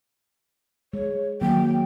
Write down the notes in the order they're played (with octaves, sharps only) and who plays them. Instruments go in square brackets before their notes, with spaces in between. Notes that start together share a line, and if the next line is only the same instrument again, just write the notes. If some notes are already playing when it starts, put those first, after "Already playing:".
[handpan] G#3 [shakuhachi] C#5
[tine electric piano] D#3 A#3 [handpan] F#3 [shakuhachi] G5